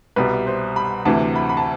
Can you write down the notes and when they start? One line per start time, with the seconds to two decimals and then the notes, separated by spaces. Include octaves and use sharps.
0.16 C2 B2 G3 B4
0.47 C5
0.76 B5
1.05 D2 C3 E3 A5
1.36 B5
1.49 B5
1.57 A5